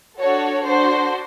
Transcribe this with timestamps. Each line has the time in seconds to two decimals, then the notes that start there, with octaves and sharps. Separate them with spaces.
0.18 D4 F#4 A4 C#5
0.65 D4 F#4 A4 C5